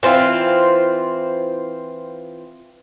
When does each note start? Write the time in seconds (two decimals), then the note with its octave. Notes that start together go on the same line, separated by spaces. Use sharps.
0.03 E3 C4 F4